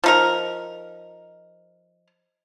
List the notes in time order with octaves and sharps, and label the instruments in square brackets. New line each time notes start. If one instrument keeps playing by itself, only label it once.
[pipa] F3 D#4 A#4